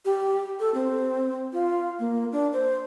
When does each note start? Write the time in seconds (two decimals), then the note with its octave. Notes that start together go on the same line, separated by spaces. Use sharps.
0.05 G4
0.60 A4
0.74 C4
1.53 F4
1.99 A#3
2.32 D4
2.53 C5